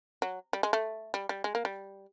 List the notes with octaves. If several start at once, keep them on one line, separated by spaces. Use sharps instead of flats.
F#3
G3
G#3
A3
G3
G3
G#3
A#3
G3